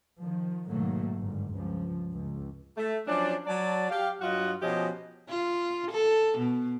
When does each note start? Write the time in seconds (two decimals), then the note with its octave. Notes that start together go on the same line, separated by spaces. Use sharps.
0.22 D#3 F3
0.68 G#2 B2 D#3 F#3 A3 A#3
1.15 G1 G#2
1.54 C#2 G2 F3
2.14 C#2
2.77 A3
3.07 F3 F#3 C#4 D4
3.46 F#3 D5 A5
3.90 G4 F5
4.21 G2 F#3 F4 F#4 D#5 F#5
4.62 B2 F3 C#4 G4 G#4 D#5
5.29 F4
5.91 A4
6.38 B2